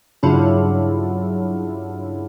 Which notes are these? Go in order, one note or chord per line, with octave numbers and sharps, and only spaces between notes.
G2 C#3 F#3 D4 E4 F4